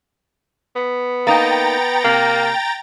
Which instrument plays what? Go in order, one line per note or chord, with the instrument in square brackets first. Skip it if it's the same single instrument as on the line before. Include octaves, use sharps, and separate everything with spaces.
[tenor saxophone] B3
[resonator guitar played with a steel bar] A#3 D#4 [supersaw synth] G5 A#5 A6
[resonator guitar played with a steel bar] C3 [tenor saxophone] A#3